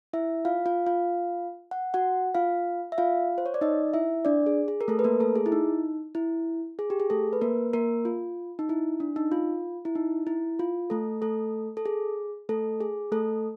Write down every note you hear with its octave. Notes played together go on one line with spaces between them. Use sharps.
E4 E5
F4 F5
F4 F5
F4 F5
F#5
F#4 F#5
F4 F5
E5
F4 F5
C5
C#5
D5
D#4 D#5
E4 E5
D4 D5
G#4
G#4
A#4
A3 A4
B4
A#3 A#4
A3 A4
G#4
E4
D#4
E4
G#4
G4
G#4
A3 A4
B4
A#3 A#4
A#3 A#4
F4
D#4
E4
D4
D#4
F4
E4
D#4
E4
F4
A3 A4
A3 A4
A4
G#4
A3 A4
G#4
A3 A4